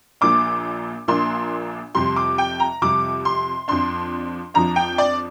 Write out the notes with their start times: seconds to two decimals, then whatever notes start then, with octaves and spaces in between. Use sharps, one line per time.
0.21 A#1 A#2 A#3 D4 D6
1.08 A#1 A#2 A#3 D4 C6
1.95 F2 C3 G3 C6
2.16 D6
2.38 G5
2.60 A#5
2.82 F2 C3 G3 D6
3.25 C6
3.68 F2 F3 D4 C6
4.54 F2 F3 D4 A#5
4.76 G5
4.98 D5